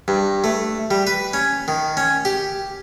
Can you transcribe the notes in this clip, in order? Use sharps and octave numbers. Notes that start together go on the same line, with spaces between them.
G2
A3
G3
B4
C#4
D#3
C#4
G4